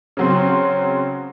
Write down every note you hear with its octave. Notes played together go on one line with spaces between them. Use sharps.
C#3 F#3 C4